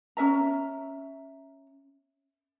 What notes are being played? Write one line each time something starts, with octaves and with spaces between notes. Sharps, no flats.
C#4 A#4 E5 A#5